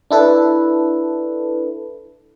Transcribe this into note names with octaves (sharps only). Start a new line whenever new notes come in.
D4 E4 A4 B4